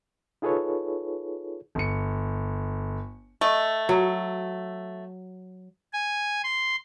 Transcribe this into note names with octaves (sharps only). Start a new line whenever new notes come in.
D#4 F4 G#4 A4 B4 C#5
G1 C#7
A3 D#5
F#3
G#5
C6